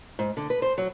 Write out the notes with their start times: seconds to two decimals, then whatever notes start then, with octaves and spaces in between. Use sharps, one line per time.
0.19 G#2
0.37 D3
0.50 B4
0.62 C5
0.78 F#3